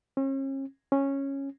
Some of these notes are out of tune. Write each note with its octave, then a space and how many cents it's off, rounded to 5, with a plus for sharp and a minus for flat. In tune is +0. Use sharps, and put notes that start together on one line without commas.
C#4 -40
C#4 -10